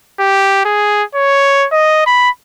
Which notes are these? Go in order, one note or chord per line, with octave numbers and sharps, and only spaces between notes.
G4
G#4
C#5
D#5
B5